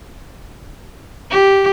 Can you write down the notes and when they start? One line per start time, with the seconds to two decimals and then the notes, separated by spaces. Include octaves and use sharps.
1.31 G4